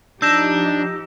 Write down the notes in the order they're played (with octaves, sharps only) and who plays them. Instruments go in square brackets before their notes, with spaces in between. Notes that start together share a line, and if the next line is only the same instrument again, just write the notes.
[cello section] F3 D#4 G4 [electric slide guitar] D4 [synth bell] E6 A#6 E7 [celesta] G6